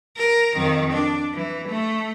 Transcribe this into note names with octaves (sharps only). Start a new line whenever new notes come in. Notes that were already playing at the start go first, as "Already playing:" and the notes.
A#4
F2 D#3
D4
E3
A3